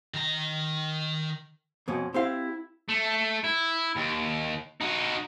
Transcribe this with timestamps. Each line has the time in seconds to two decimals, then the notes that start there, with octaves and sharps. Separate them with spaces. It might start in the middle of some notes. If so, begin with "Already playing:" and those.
0.14 D#3 A#5
1.88 F2 B2 C#4
2.14 C4 E4 G4 F5
2.89 A3
3.44 E4
3.96 D#2
4.81 D#4 F#4